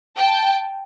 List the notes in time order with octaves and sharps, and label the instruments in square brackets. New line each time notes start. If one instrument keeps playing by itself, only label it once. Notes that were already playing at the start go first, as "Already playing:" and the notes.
[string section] G5 A5